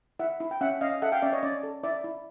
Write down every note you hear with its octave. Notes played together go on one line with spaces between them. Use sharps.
E4 E5 F#5
E4
G5
C#4 E5 F#5
C#4 D#5 F5
A4 E5 F#5
F5 G5
C#4 D5 E5
C#5 D#5
C#4 D5
A4
E4 D5 E5
E4